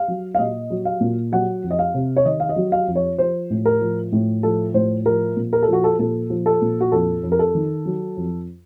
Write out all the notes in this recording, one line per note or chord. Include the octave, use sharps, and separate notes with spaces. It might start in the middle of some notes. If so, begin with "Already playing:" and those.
Already playing: F5
F#3
F5
A#2 D#5
F#3
F5
A#2
F#3 F#5
F2
D#5
F5
C3
C#5
D#3 D#5
F5
D#5
F#3
F5
F2
C#5
F3 C5
A2
A#4
F3
A2
F3 A4
A2 C5
F3 A#4
A#2
A#4
A4
F3 F#4
A4
A#2 A4
F3
A4
A#2
F#4
F2 A4
F2
A#4
A4
D#3
F#3
F2